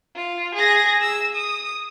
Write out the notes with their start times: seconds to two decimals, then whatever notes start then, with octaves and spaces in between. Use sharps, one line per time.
0.16 F4
0.55 G#4 A#6
1.01 E6
1.35 D#6